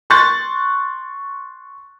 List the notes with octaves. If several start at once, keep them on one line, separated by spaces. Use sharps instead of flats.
C6 C#6 F#6 A6